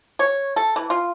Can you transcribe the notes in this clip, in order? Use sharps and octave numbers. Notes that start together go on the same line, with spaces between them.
C#5
A4
E3
F4